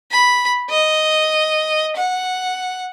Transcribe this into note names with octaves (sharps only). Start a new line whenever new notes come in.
B5
D#5
F#5